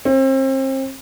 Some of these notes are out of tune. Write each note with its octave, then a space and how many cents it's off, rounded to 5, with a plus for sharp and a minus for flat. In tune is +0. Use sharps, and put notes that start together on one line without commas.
C4 +35